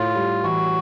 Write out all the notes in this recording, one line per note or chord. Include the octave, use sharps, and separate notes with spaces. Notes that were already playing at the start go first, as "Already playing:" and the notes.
Already playing: A2 F4
G3
E3 F#4